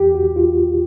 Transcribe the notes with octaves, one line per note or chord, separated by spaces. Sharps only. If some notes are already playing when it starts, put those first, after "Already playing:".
Already playing: E2 G4
F#4
E2
F4